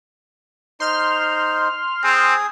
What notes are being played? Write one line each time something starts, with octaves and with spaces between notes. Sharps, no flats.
D#4 C5 C6 F6
C4 G#4 G#5 D#6